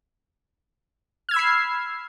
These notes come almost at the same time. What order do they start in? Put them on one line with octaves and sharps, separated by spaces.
F6 G#6 E6 B5 C7